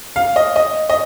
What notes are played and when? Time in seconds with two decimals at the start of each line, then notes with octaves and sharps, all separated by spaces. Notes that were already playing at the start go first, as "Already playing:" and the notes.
0.16 F5
0.36 D#5
0.56 D#5
0.89 D#5